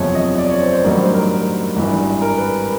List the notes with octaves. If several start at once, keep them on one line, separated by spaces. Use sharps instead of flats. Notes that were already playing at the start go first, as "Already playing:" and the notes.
Already playing: F#1 E2 C3 F3 C#5
D#5
D5
C#5
C5
C5
A1 G2 D#3 F#3 A#4
C5
A#4
G#1 G2 E3
A#4
B4